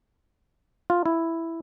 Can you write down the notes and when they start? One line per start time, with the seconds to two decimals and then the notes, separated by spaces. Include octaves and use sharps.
0.90 F4
1.06 E4